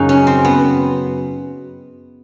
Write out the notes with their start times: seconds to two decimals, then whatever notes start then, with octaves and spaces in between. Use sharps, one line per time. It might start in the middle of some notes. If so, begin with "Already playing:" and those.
Already playing: F#2 C#3 F#3 D#4 G#4
0.09 C#4
0.27 C4
0.45 B3